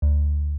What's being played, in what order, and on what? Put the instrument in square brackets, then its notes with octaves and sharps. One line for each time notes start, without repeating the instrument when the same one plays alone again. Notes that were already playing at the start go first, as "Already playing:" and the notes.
[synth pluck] D2